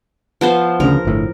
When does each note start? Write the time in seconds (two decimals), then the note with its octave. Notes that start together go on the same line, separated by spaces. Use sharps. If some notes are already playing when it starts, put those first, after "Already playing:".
0.41 F3 B3 C5
0.80 D2 C#3 A#4
1.05 G1 A2